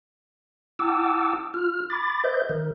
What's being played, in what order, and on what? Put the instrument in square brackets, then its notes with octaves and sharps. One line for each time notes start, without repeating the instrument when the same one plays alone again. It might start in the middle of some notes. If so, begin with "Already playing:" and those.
[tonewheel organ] E4 F#5 G5 A5 D6 E6
F4 F6
B5 D6 A6
B4 C5 D#5 E5 G6
D#3 A#4